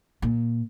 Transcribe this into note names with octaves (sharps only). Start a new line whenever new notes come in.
A#2